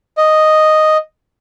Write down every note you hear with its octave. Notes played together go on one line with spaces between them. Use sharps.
D#5